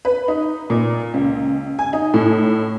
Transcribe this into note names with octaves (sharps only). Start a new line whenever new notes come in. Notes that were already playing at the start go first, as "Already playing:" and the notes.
B4
D#4
A#2
C#2
G#5
D#4
A2